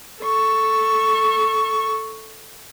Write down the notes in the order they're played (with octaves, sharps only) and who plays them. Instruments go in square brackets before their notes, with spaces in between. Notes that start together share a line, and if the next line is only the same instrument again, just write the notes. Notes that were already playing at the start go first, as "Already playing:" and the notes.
[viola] A4 C#6